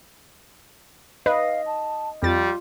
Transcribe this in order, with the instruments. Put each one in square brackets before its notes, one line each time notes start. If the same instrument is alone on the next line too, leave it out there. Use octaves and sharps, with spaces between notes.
[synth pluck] B4 [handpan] D#5 [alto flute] F5
[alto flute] A5
[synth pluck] F2 A6 [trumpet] G3 [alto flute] F4